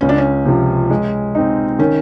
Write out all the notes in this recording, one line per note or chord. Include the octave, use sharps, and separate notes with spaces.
C#2 C#4
D4
C#4
C3 F3
G#3
C4 D#4
D#3 C#4